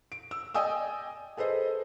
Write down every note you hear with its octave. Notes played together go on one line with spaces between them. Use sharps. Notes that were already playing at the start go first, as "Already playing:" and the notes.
D7
E6
D5 D#5 G5 G#5 D#6 E6
G#4 A4 B4 C5 D#5